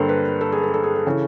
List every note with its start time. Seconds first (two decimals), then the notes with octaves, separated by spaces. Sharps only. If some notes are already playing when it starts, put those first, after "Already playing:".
Already playing: G2 D3 G3 A#3 A4 C5
0.09 B4
0.41 A4
0.52 G#4
0.63 A4
0.74 A4
0.84 G#4
0.96 A4
1.07 C#3 E3